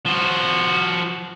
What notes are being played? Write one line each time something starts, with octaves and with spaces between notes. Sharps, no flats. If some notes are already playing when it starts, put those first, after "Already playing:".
F3 F#4